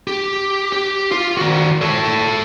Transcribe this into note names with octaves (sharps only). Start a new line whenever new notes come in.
G4
G4
F4
D#3 F#4
A4 C#5